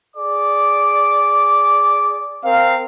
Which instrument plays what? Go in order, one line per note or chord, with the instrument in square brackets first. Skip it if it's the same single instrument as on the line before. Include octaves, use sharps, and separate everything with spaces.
[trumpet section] G#4 D5 D6
C4 A#4 F5